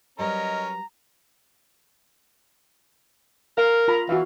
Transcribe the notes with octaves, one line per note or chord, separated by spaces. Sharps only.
F#3 G3 C#4 A#4 B4 D#5 A#5
A#4 F5
F4 A#5 B5
E3 F#4 F5